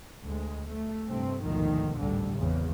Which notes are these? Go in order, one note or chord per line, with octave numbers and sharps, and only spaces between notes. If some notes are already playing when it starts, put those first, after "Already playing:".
D2 G#3
A3
G2 C3 A3 C4
A1 D2 G#2 B2 D#3 F3
G#1 D2 A2 D3 G3
G#1 E2 C#3